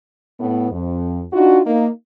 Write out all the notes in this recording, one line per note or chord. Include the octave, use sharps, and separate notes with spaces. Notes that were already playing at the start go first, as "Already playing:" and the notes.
A2 B3
F2
D4 D#4 F4 F#4
A#3 D#4